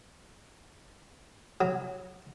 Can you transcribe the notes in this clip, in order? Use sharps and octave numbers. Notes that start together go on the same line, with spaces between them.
F#3